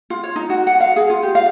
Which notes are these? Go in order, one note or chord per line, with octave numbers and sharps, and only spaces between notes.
F4
C#5
D#4
F#4
F#5
F5
G#4
F4
G4
F5